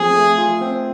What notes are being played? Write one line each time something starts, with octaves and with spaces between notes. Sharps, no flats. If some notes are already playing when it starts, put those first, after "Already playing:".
Already playing: F3 A3 C4 G#4
A3
F4
C4